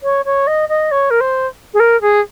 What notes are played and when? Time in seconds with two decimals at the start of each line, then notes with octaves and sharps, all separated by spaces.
0.03 C#5
0.25 C#5
0.47 D#5
0.69 D#5
0.91 C#5
1.10 A#4
1.20 C5
1.74 G#4
1.80 A#4
2.01 G#4